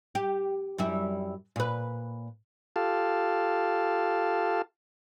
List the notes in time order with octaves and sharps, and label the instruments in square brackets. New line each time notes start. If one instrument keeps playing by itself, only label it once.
[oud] G4
F#2 G3 E4
A#2 B4
[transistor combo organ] F4 G4 A4 F5 A5